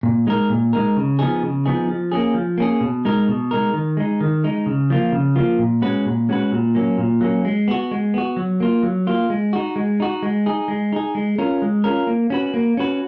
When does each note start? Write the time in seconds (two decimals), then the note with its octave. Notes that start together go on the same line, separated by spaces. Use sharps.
0.03 A#2
0.27 G#3 D#4 A#4
0.49 A#2
0.73 G#3 D#4 A#4
0.97 C#3
1.19 F3 B3 D#4 G#4
1.43 C#3
1.65 F3 B3 D#4 G#4
1.88 F3
2.12 A#3 C#4 G#4
2.34 F3
2.58 A#3 C#4 G#4
2.81 B2
3.05 G#3 D#4 A#4
3.28 B2
3.51 G#3 D#4 A#4
3.74 D#3
3.97 G#3 D#4
4.21 D#3
4.44 G#3 D#4
4.66 C#3
4.90 F3 A#3 F4
5.12 C#3
5.35 F3 A#3 F4
5.59 A#2
5.82 G#3 C#4 F#4 B4
6.06 A#2
6.29 G#3 C#4 F#4 B4
6.52 A#2
6.75 F#3 A#3 C#4
6.98 A#2
7.21 F#3 A#3 C#4
7.45 G#3
7.68 B3 F#4
7.91 G#3
8.14 B3 F#4
8.37 F#3
8.60 A#3 F4
8.83 F#3
9.07 A#3 F4
9.30 G#3
9.53 D#4 F#4
9.76 G#3
10.00 D#4 F#4
10.22 G#3
10.46 D#4 G#4
10.68 G#3
10.93 D#4 G#4
11.15 G#3
11.38 C#4 F4 A#4
11.62 G#3
11.84 C#4 F4 A#4
12.07 A#3
12.30 C#4 F#4 B4
12.54 A#3
12.77 C#4 F#4 B4